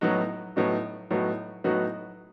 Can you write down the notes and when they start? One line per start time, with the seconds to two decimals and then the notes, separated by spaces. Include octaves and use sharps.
0.01 A2 F#3 B3 D#4 F#4
0.56 A2 F#3 B3 D#4 F#4
1.11 A2 F#3 B3 D#4 F#4
1.64 A2 F#3 B3 D#4 F#4